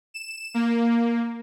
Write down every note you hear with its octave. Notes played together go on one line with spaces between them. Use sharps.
E7
A#3